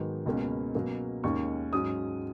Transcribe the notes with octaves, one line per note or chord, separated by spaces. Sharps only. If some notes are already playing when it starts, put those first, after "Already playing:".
Already playing: G#2 D#3 F#3 B3
C#2 B2 A#3 C#4
B2 F#3 A#3 C#4
D#2 D#3 G#3 C#4 C#6
G#2 F#3 C#4 D#6